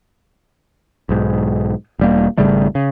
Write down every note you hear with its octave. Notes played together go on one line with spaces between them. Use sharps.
B1 G#2
E1 G3 A#3
G#1 C#3 G3 A3
C#3